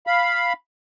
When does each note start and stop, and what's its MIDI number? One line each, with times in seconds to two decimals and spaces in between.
0.07 0.53 77
0.07 0.53 83